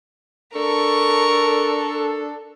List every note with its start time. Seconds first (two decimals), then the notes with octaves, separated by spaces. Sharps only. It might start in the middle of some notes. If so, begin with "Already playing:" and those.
0.55 D4 A4 A#4 C#6